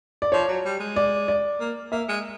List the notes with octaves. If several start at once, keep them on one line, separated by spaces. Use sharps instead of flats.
D5
F3 C#5
F#3
G3
G#3
D5
D5
A#3
A#3 E5
G#3